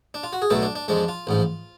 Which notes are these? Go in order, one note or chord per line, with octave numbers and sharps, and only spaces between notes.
D4
F4
F#4
G#4
B1 B2 F#3 A3 A4
D4
D4
F2 F3 G#3 D4
F4
A1 G#2 F3